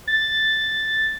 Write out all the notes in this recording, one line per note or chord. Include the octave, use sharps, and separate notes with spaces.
A6